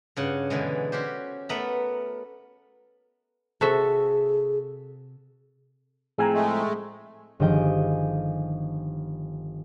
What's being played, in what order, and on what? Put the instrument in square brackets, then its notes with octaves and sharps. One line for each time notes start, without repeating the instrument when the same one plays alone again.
[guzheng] G2 C#3 F#5
B2 D3 E3 G#3
C#4 F#4 G4 C5
A3 B3 A#4 E5 A#5 B5
[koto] C3 F#4 E5 [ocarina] G#4 [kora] A4
[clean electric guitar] A2 F3 C4 [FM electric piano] G#4 G#5 A#5
[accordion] G#3 A3
[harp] G1 D#3 F3 G#4 D#5 G5